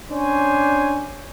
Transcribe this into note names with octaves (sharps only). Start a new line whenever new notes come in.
C#4 D4 C5 C#5 G#5